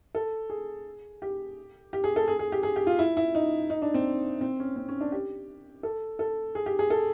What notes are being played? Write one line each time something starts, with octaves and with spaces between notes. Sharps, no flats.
A4
G#4
G4
G4
G#4
A4
G#4
G#4
G4
G#4
G4
F4
E4
E4
D#4
D#4
D4
C4
C4
C#4
C4
C#4
D4
G4
A4
A4
G#4
G4
G#4
A4